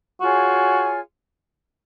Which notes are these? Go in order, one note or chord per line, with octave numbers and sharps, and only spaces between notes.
F4 F#4 G#4 C#5 G#5